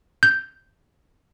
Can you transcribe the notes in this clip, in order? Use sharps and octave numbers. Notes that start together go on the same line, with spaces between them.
G6